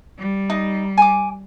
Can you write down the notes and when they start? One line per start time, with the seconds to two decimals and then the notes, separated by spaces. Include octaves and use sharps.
0.19 G3
0.50 D#4
0.97 G#5 D6